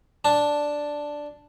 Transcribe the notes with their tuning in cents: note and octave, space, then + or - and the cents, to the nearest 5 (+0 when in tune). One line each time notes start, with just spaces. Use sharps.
D4 +0 A5 +0